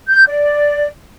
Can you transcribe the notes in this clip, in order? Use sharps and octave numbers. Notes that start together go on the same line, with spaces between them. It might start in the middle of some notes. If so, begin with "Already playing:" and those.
G6
D5